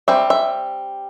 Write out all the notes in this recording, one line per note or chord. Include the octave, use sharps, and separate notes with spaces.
G3 C4 E5
E5